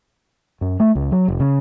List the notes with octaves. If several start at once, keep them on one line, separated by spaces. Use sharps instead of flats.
F#2
A3
C#2
F#3
F1
C#3